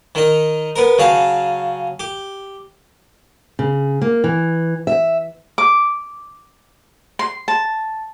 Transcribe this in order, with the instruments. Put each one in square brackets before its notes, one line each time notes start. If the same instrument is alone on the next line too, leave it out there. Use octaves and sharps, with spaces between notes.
[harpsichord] D#3 D#4
B3 A#4
C#3 F#3 F5 A5
G4
[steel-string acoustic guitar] C#3
A#3
E3
E5
[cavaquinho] D6
C6
A5